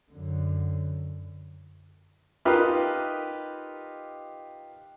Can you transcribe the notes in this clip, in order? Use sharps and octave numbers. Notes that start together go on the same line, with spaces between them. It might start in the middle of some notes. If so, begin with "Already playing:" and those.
F#2 D3
D#4 F4 G4 A#4 B4 D#5